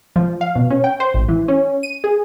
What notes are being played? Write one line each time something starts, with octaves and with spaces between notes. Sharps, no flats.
F3
F5
B2
C#4
G5
C5
A1
E3
C#4
D#7
G#4